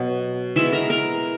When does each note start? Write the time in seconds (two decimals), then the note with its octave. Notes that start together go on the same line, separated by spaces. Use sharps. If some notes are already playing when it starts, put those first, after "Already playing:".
Already playing: B2 F#3 B3
0.56 E3 G#3 B3 E4 E5
0.73 A#4 A#5
0.90 A#4 A#5